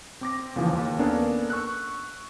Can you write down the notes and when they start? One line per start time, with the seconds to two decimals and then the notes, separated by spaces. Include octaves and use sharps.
0.21 C4 D6 A#6
0.56 D#2 C#3 E3 F3
0.73 D#2
0.99 A#3 B3 C#4 D4 A4 A#4
1.50 C#6 E6 F#6